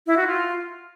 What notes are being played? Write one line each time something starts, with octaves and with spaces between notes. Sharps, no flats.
E4
F#4
F4